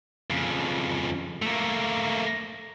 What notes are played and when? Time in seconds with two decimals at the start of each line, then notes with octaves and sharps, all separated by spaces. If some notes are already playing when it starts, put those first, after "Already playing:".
0.30 F2 C#3
1.42 A3 A#3